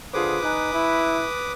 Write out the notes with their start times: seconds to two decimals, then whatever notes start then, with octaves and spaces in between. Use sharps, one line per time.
0.13 D3 F4 G#4 B4 C5 D6 D#6
0.43 D#4 G#5 F#6
0.74 E4